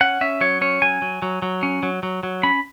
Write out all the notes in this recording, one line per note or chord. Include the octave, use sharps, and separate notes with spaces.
C#4 F#5
C#4 E5
F#3 C#5
C#4 C#5
F#3 G#5
F#3
F#3
F#3
C#4
F#3
F#3
F#3
C#4 B5